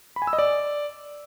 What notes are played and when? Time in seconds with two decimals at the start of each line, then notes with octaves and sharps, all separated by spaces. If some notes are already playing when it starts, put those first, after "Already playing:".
0.16 B5
0.22 G#5
0.27 E6
0.33 D#5
0.39 D5